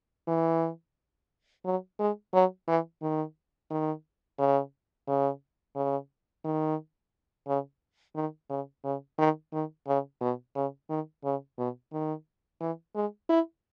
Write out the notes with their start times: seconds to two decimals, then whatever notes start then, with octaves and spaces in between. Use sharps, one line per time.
0.28 E3
1.65 F#3
1.99 G#3
2.33 F#3
2.68 E3
3.02 D#3
3.71 D#3
4.39 C#3
5.08 C#3
5.76 C#3
6.44 D#3
7.47 C#3
8.15 D#3
8.50 C#3
8.84 C#3
9.18 D#3
9.53 D#3
9.87 C#3
10.21 B2
10.55 C#3
10.90 D#3
11.24 C#3
11.58 B2
11.92 D#3
12.60 E3
12.95 G#3
13.29 E4